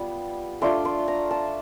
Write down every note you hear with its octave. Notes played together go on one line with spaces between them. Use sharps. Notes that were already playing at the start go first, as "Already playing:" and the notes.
Already playing: G3 B3 F4
A3 D4 F4 C6
C6
A#5
A5